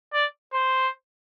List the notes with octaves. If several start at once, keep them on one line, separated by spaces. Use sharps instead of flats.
D5
C5